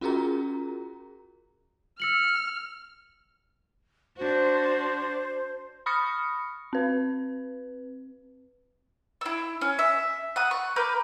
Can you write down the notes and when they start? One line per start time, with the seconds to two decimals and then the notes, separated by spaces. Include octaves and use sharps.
0.01 C#4 F4 F#4 G#4 A#4 A#5
2.00 E6 F6 C#7 F#7
4.17 D4 F#4 C5
5.86 B5 C#6 D#6 F6 A#6 C#7
6.73 C4 B4
9.21 E4 E6
9.61 C#4
9.79 E5
10.36 F#5 D#6
10.51 C#6
10.76 A#4 B4 D6 G6